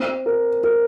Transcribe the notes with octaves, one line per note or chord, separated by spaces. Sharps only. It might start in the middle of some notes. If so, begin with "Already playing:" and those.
Already playing: C4
A#4
A#4